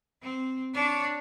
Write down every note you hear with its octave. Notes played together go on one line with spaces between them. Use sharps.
C4
D4 C#5